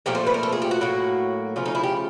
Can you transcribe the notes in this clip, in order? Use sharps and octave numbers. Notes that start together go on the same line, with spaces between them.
A#2 F3 A3 G4
C5
B4
A#4
A4
G#4
G4
F#4
A2 F#3 A#3
C#3 F3 A3 F4
D#4
E4
G4